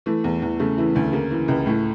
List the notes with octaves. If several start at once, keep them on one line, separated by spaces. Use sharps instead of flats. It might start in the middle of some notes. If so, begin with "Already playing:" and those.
E3 A3
E2
E2
C#3 A3
E3 E4
D2 A3
C#3 A#3
E3
C#2
A2 A3